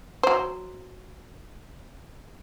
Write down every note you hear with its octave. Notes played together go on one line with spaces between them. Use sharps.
F#3 C5